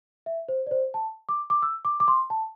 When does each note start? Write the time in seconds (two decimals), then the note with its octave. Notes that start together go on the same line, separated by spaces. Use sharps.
0.26 E5
0.49 C5
0.67 D5
0.71 C5
0.94 A5
1.29 D6
1.50 D6
1.62 E6
1.85 D6
2.00 D6
2.08 C6
2.30 A5